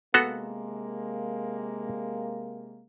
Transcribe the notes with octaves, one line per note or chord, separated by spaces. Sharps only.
C3 G#3 A#3 B3 F#4 A4